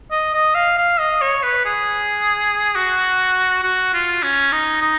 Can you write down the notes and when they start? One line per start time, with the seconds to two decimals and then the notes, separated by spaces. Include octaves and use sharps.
0.11 D#5
0.33 D#5
0.55 F5
0.78 F5
0.99 D#5
1.21 C#5
1.43 B4
1.65 G#4
2.75 F#4
3.63 F#4
3.93 F4
4.23 C#4
4.52 D#4
4.81 D#4